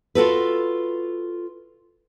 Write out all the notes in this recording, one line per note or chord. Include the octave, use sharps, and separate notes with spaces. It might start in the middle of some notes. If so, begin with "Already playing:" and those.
F4 F#4 A4 B4